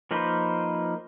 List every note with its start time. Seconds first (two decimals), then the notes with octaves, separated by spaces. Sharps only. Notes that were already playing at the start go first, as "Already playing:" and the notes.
0.11 F3 A#3 D#4 B4 C5